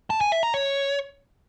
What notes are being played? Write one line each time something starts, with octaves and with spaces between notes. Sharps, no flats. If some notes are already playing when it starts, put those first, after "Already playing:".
A5
G#5
E5
A#5
C#5